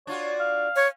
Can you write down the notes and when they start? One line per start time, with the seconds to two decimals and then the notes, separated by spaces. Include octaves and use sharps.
0.07 D4 F4 F#4 C#5
0.40 F5
0.76 C#5